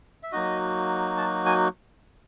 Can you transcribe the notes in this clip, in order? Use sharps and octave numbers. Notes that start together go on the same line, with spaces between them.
E5
F#3 A#3 D#4 F#4 D#5
A5
G#5